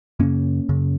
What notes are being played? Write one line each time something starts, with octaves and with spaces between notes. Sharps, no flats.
F#2 C#3 A#3 C#4
F#2 C#3